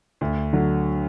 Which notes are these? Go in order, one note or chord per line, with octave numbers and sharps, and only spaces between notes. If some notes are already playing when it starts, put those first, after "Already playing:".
D2
D3 F#3